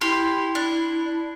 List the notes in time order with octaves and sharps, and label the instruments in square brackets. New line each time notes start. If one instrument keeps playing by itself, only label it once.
[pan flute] E4 [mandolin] G4 C6
[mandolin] D4